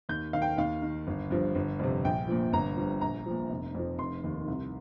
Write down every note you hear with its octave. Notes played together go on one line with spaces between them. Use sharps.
D#2 G6
D#3 F5
G5
D#2 F5
D#3
G1
G2 F3
G1
F2 C3
A#1 G5
A#2 F3
G1 A#5
G2 F3
A#1 A#5
A#2 F3
F1
F2 F3
F1 C6
D#2 D#3
C2